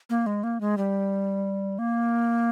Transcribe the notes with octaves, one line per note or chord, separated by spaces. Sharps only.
A#3
G#3
A#3
G#3
G3
A#3